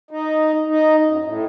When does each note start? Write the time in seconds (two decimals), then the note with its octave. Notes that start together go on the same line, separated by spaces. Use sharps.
0.11 D#4
0.68 D#4
1.06 F#2
1.25 A2